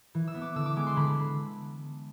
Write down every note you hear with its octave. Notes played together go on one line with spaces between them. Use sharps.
E3
E6
B3
D6
D3 E6
D6
G#3 B3 D6
C6
D3 B5